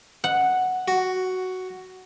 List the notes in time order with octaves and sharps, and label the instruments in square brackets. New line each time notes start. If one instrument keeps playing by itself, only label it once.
[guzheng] F#5
[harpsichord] F#4